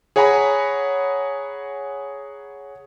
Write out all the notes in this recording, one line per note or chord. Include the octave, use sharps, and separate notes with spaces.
G#4 C#5 F#5 G#5 A#5 B5